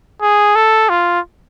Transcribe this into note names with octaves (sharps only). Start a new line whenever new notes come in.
G#4
A4
F4